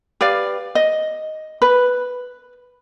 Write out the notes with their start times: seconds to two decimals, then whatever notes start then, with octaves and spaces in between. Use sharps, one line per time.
0.21 G4 B4 D5 F5
0.75 D#5
1.62 B4